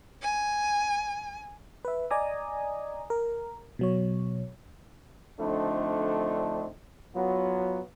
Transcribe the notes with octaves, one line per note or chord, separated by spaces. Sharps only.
G#5
B4 E5
D5 D#5 G#5 A#5 D#6
A#4
B2 F#3 C#5
D3 F3 A3 C4 D4 D#4
F#3 B3 F4